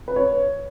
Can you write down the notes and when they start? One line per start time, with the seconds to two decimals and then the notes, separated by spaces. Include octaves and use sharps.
0.08 B4
0.16 C#5